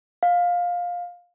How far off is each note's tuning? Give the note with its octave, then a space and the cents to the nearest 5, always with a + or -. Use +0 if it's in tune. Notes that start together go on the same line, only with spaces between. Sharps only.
F5 +15